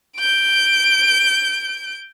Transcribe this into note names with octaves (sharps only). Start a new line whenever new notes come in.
G6 D7